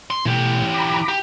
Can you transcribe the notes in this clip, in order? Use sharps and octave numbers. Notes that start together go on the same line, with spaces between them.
C6
B2 E3 A3 G4
A#5 B5 D6
G4